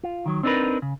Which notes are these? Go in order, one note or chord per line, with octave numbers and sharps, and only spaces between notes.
F4
D#3 F#3
C4 D4 D#4 G#4 A#4 B4
C#3